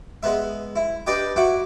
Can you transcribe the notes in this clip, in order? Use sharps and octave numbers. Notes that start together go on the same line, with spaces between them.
G#3 B3 B4 E5
E4
D4 G4 B4 D5 D#5 G5
E4 F#4 F#5 D6